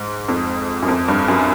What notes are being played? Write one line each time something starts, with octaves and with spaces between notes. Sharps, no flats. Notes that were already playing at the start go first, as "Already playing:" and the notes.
Already playing: G#2
F2
F#2
F2
G2
F#2